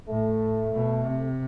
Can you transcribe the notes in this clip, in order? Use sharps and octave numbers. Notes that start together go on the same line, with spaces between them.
A2 A3
B2
C3